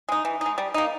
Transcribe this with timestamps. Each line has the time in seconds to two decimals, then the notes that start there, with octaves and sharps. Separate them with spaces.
0.09 G#3 D#4
0.25 E3
0.41 G#3 D#4
0.58 G3
0.74 A#3 D#4